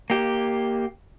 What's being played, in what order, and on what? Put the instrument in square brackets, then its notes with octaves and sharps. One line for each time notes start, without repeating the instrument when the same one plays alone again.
[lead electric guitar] A#3 G4